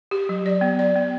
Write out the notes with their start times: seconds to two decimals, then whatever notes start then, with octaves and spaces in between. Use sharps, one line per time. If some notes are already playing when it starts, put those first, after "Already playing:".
0.11 G4
0.29 F#3
0.46 D5
0.61 B3
0.79 D5
0.96 B3